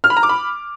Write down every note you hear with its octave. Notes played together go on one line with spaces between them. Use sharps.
F6
B5
A#5
D6
B5